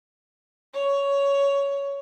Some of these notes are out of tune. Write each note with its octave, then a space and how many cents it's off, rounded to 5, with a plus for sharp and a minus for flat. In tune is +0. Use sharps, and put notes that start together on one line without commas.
C#5 +10